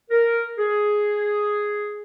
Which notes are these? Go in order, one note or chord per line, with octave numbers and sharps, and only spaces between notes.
A#4
G#4